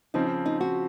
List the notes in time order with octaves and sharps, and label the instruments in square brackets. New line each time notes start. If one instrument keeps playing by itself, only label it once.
[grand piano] C#3 F3 C4 [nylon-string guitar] D#4
[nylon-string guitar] D#4
F#4